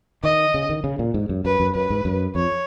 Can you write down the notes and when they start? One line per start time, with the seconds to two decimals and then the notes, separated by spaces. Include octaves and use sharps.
0.24 D#3 D#5
0.54 C#3
0.70 D#3
0.84 C#3
0.99 A#2
1.14 G#2
1.29 F#2
1.45 F#2 B4
1.60 F#2
1.75 F#2 B4
1.90 G#2
2.05 F#2
2.35 F2 C#5